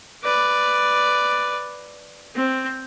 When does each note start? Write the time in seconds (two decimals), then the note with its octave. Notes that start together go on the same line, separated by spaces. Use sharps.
0.24 B4 D5
2.35 C4